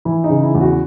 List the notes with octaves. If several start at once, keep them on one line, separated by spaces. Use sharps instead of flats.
E3 E4
D#4
C#3
E4
E2
F#4